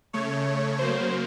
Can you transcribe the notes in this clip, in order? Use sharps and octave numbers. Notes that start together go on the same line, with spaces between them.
C#3 A3 C#5
C#3 F#3 A#3 C5